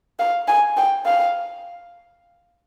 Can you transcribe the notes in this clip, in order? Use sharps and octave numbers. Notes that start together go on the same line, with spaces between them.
F5
G#5
G5
F5